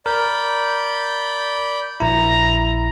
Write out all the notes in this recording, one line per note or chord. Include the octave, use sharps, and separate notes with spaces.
A#4 D5 B5 G6
A#1 E4 A#5